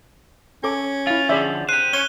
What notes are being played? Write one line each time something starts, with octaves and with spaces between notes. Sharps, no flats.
C#4 A4 D6
E4 F4 F5
D3 F3 G#4 D5 E5
G4 C5 F#6 D#7
C#4 C#5 G7